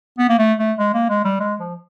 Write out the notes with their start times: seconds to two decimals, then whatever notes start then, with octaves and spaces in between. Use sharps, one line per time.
0.19 B3
0.29 A#3
0.39 A3
0.59 A3
0.79 G#3
0.94 A#3
1.09 G#3
1.25 G3
1.40 G#3
1.60 F3